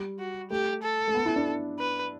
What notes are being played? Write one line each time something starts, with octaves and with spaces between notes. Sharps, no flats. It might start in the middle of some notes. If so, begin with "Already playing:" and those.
Already playing: G3
F#4
A3 G4
A4
A3
B3
E4
D4
B4